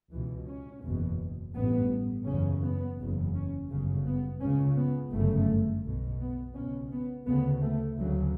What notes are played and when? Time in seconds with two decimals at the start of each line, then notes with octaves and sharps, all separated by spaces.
0.12 C#2 B2 E3
0.48 C#4
0.83 F#1 E2 B2
1.55 A1 G2 B3
2.27 F#1 E2 C#3 C#4
2.62 B3
2.98 F#1 E2 C#3
3.35 C#4
3.70 G1 F#2 C#3
4.06 B3
4.41 C#2 C#3 C#4
4.77 B3
5.12 G1 F#2 C#3 A3
5.85 B1 B2
6.21 B3
6.55 C#2 B2 C#4
6.92 B3
7.27 D2 C#3 B3
7.63 A3
7.99 D2 C#3 F#3